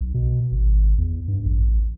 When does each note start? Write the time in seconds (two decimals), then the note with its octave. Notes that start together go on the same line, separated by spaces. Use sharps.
0.01 B1
0.14 B2
0.52 G#1
0.98 E2
1.28 G2
1.45 A1